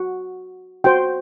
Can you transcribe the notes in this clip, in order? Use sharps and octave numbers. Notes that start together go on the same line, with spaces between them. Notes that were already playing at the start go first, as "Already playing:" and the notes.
Already playing: F#4
F#4 C5 G5